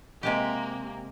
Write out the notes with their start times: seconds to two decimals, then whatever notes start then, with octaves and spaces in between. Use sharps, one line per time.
0.23 C3 G#3 A#3 G4